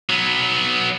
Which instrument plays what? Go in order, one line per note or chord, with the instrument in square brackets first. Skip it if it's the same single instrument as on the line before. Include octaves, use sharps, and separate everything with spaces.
[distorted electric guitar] F#3 B3